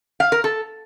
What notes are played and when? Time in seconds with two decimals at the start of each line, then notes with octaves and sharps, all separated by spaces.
0.20 F5
0.32 A#4
0.44 A4